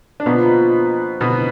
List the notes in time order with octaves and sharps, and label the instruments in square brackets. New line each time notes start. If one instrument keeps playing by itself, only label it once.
[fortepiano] D4
[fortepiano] B2 B3 [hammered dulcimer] F3 A#3 D#4
[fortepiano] B2 B3